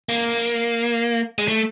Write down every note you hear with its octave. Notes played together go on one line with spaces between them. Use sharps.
A#3
G#3
A3